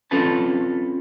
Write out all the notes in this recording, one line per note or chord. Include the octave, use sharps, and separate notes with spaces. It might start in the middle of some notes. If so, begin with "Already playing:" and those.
C4 C#4 F4 A4 B4 A5